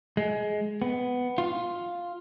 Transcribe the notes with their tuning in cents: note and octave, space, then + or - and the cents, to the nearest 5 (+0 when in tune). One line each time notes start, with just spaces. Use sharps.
G#3 +15
B3 +10
F4 +5